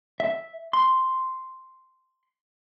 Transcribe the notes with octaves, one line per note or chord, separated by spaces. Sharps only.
E5
C6